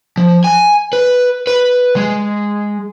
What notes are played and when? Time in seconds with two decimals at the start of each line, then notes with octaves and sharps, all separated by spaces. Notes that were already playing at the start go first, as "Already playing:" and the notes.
0.17 F3
0.44 G#5
0.93 B4
1.47 B4
1.96 G#3